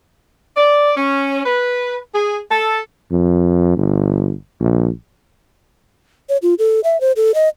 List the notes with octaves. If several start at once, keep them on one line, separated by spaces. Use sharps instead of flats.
D5
C#4
B4
G#4
A4
F2
G1
A#1
C#5
F4
A4
E5
C5
A4
D#5